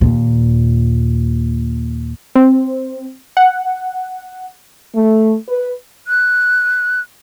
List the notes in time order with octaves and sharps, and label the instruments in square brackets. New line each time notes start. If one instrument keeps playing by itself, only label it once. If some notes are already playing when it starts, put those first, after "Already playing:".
[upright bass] D#2 A#2
[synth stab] C4
F#5
[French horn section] A3
B4
[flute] F#6